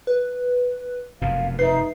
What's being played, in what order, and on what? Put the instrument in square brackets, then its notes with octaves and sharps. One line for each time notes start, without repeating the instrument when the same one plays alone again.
[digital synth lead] B4
[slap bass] F1 F#2 B2 [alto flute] F5
[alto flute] D#4 [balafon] B4 E5 [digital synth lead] C7